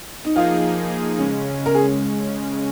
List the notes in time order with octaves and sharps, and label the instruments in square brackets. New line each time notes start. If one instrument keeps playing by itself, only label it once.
[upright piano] D#4
[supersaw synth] F3 A#3 D#4 G#4 [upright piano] F4
[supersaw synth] C#3 G#3 C#4
[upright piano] A#4
G#4